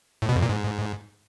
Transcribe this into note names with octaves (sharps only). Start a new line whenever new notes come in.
A2
B2
F2
A#2
G#2